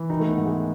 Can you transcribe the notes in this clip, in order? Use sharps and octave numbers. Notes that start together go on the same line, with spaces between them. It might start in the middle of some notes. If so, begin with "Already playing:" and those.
Already playing: E3
D#3 D#4
A3
B3
G#2
G#3